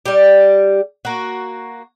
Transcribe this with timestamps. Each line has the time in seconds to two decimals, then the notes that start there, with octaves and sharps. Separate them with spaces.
0.06 G3 G4
1.05 A#3 F#4